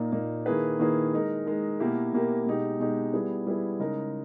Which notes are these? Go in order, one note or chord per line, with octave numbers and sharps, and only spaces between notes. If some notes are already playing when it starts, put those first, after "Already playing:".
Already playing: A#2 A#3 D#4
A#2 A#3 D#4
D#3 A#3 E4 G#4 B4
D#3 A#3 E4 G#4 B4
G#3 D#4 A#4
G#3 D#4 A#4
B2 A#3 E4 G4 A#4
B2 A#3 E4 G4 A#4
B2 G#3 D#4 G4
B2 G#3 D#4 G4
G3 B3 E4 G#4
G3 B3 E4 G#4
C#3 G#3 D#4 A#4